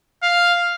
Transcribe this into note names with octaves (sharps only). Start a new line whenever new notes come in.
F5